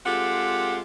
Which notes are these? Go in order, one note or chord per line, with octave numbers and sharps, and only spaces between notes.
G#3 C4 F4 G4 A4 F#5